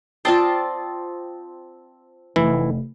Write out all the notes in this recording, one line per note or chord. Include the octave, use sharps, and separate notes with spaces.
C4 F4 D5 A5 C6 D#6
F1 E3 D#4 E4